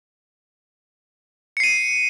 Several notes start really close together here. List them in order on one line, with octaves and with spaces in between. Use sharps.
C#7 C7 D#7